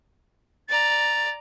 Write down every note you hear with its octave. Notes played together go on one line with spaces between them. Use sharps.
D5 A#5 A6